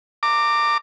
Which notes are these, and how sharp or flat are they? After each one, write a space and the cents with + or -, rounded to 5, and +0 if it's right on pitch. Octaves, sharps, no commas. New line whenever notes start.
A#5 -30 D6 +10